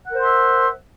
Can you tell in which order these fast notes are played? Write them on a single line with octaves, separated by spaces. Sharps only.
F#5 A#4 C5 C6 E5